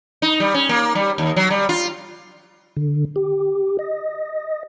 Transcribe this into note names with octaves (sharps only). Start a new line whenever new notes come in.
D#4
G3
C#4
A#3
G3
D#2
F#3
G3
F4
D3
G4
D#5